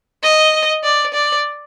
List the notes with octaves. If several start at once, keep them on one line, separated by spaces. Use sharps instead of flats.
D#5
D5
D5